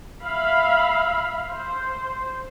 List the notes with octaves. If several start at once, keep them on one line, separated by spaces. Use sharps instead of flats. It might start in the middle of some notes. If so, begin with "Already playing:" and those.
E5 F5 B5
C5